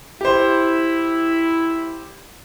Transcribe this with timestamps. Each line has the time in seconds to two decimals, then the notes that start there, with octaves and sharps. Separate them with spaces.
0.21 E4 G4 C5